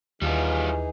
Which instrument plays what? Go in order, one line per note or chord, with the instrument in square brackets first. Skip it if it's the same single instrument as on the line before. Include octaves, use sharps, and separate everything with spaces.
[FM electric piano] D#2 [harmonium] E3 D#4 G#4 [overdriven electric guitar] G3 F4